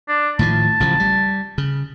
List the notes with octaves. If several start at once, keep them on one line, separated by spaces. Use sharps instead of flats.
D4
A2 D#3 F3 A5
A1 C#3 F3
G3
C#3